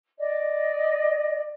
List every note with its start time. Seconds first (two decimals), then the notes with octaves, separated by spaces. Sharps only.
0.18 D5 D#5